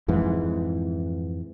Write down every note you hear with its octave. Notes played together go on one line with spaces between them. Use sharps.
F2 G#2 E3